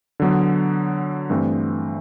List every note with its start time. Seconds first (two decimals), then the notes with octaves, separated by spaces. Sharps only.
0.20 D3 F#3 B3
1.30 G2 E3 A3 C4